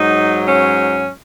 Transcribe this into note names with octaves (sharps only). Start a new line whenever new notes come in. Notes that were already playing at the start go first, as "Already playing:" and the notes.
Already playing: G#2 F#3 D#4
C#4